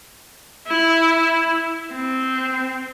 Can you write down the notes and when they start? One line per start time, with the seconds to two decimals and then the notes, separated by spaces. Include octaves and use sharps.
0.67 E4
1.93 C4